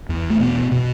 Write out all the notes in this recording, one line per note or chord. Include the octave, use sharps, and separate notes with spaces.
E2
A3
B2 B3
B2